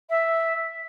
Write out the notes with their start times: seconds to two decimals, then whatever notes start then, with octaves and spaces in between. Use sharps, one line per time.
0.09 E5